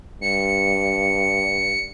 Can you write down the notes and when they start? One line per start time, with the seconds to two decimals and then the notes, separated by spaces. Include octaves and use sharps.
0.21 G2 C#7